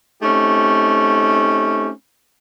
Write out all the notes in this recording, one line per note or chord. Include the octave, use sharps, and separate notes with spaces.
A3 C4 C#4 D#4 G4